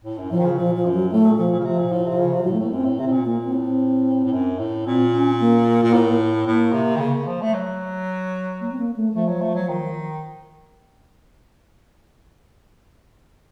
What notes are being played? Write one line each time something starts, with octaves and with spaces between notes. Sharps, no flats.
A2
F#2
A2 F3
D#3
C#3
A#2 F3
F3
F#2
F#3
A2 A3
A#2
A#2 F3
A#2
C#3
C3 F3
A#2
A2
C3
C#3
C3
A2 F#3
A3
A2 A#3
F#2 C4
A2
C3 C4
A2
A#2
A#2 A#3
C4
A2
C4
A2
F#2
A2
A#2 C4
C#4
A#3
A#2
A2
A2 A#3
C3
D#3
C#3
F3
A3
F#3
A#3
C4
A#3
A3
F3 A3
F#3
A3
F#3
D#3